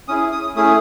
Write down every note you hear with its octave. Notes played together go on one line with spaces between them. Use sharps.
C#4 E4 G#4 D#6
D#6
A3 C#4 E4 G#4 D#6